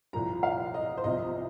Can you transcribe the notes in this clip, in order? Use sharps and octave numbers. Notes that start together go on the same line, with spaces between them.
C2 A#2 F3 A#5
F5
D#5
C5
C2 C3 F3 D#5